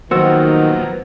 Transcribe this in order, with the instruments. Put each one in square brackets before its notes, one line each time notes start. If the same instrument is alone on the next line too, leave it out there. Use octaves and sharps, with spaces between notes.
[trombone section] D#3 [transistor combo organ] F3 F#3 A#3 [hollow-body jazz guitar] B3 F#4 [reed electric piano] C5 E6